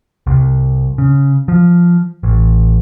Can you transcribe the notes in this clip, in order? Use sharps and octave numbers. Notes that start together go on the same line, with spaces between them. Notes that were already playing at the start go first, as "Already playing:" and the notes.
C2
C#3
F3
A1